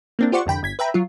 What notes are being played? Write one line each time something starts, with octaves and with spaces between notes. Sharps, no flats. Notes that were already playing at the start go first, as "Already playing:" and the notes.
A#3 C4 D4
F4 G4 C5 D5 F#5 C#6
C2 F2 D3 G5 B5
G1 G#6 B6
B4 E5 G5 A#5 B5
F#3 F4